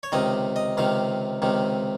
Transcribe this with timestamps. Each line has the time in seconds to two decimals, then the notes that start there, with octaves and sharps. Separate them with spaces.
0.03 C#5
0.12 C#2 C3 D#3 D#5
0.56 D#5
0.77 C#2 C3 D#3 F5
1.42 C#2 C3 D#3